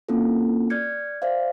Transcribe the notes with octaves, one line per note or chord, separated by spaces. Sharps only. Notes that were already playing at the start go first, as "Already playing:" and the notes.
A#3 C4 C#4 E4 F4 A4
D5 F6 G6 G#6 C#7
C5 D5 E5 F5